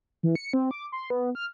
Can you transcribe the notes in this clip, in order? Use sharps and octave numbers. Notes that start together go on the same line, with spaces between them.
E3
C#7
C4
D6
C6
B3
F6